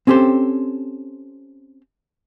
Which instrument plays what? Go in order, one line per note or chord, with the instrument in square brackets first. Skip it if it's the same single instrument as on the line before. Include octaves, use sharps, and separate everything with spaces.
[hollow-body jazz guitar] C4 C#4 G4 A4 C5